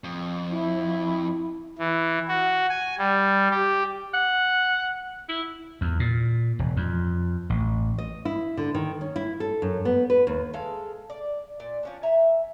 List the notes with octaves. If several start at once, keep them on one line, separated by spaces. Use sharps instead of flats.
F2
E4
E3
F#4
G#5
G3
G4
F#5
E4
E2
A#2
E1
F2
A1
D#5
E4
D3
D#3
C#4
E4
A4
F#2
B3
B4
D#2
G#3 A4 F5
D5
A#2 D5
F3 C#4 D4
E5 G#5 A#5